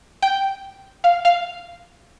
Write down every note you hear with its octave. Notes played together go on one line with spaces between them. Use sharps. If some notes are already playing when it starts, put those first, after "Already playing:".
G5
F5
F5